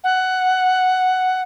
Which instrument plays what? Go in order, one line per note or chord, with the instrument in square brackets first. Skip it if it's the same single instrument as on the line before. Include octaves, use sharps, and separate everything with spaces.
[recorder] F#5